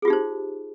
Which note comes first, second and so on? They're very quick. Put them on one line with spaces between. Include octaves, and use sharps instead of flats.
G#4 F4 G4 D#4 C5